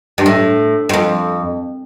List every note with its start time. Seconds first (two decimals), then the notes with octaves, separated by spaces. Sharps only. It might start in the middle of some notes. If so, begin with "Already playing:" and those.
0.18 G2
0.26 A2
0.89 G2
0.93 F2